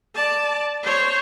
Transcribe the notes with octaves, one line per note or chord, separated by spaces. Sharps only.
D5 A5
C5 C#5